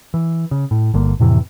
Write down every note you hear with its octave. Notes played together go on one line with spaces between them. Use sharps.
E3
C#3
A2
G1 D3 A#3
F2 A2 C3 E3